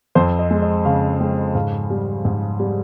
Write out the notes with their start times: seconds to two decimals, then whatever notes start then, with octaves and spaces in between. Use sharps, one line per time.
0.15 F2 C5
0.39 D#5
0.51 G#3
0.62 D#5
0.85 C#3 F5
1.20 G#3 G5
1.55 G#2 F5
1.90 G3
2.25 G#2
2.60 G3